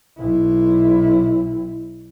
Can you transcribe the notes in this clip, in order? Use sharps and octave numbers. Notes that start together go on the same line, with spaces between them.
B1 E4